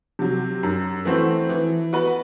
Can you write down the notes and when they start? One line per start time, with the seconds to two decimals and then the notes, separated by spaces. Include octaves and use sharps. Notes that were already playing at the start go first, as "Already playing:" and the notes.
0.19 C3 F#3
0.63 F#2
1.05 E3 A3 C4 F#4
1.49 E3
1.93 B3 F#4 B4